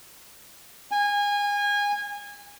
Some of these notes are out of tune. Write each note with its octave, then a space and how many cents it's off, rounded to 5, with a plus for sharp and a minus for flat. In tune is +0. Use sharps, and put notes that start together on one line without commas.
G#5 -25